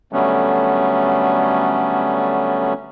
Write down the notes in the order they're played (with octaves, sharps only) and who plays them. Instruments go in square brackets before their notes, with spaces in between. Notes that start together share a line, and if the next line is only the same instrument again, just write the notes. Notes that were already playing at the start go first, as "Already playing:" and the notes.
[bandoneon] D3 F#3 G3 A3 B3 C#4